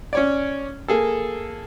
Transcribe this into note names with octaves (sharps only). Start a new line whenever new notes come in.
C#4 C#5 D5
A#3 G#4 A4